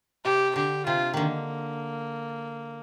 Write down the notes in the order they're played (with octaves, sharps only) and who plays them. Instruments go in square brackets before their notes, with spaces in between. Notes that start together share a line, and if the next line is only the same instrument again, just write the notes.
[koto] C3 [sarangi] G4
[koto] D3 [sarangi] G4
[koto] C3 [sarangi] F4
[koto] D3 D#3 [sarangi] A#3